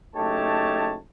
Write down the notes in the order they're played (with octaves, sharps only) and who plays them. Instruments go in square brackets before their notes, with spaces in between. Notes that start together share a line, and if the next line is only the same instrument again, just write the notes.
[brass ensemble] F#1 A3 D#4 G4 C#5 A5